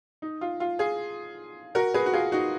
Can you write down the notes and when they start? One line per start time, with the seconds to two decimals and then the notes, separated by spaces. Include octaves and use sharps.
0.22 D#4
0.41 F4
0.60 F4
0.79 F4 G#4
1.75 F#4 A#4
1.94 G#4 B4
2.06 F#4
2.13 F4 G#4
2.32 D#4 F#4